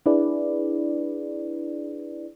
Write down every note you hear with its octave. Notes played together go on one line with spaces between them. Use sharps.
D4 E4 G#4 B4 D5